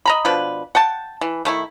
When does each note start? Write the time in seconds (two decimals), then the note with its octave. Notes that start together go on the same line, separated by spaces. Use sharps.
0.06 D#5 A#5 B5
0.25 B2 F3 D4 B4
0.75 F#5 G5 A5
1.21 E3
1.45 D#3 A3 E4